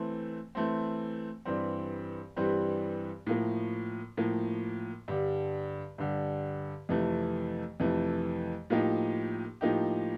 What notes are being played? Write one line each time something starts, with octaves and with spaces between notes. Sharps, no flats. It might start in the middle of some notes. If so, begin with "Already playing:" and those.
Already playing: E3 A3 C4
E3 A3 C4
G2 E3 G3 C4
G2 E3 G3 C4
A2 F3 A#3
A2 F3 A#3
G2 D3 G3
G2 D3 G3
F2 C3 E3 A3
F2 C3 E3 A3
A2 F3 A#3 D#4 G4
A2 F3 A#3 D#4 G4